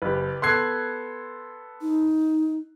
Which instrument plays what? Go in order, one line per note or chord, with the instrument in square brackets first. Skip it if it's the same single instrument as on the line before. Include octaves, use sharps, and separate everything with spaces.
[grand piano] F#1 [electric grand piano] G4 B4
[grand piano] B3 A4 C7 [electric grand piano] C6 F#6 G#6
[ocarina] D#4